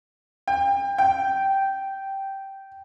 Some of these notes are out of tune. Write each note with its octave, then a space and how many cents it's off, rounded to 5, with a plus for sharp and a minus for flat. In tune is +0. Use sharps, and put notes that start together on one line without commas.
G5 +25
G5 -10